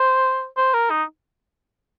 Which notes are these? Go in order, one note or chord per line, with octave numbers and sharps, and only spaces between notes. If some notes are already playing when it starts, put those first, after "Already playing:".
Already playing: C5
C5
A#4
D#4